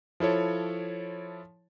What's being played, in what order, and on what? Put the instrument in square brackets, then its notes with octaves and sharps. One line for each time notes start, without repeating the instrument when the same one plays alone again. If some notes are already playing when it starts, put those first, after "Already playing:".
[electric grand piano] F3 E4 A4 C#5